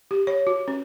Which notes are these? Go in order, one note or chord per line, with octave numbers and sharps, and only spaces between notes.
G4
C#5
F#4
C#4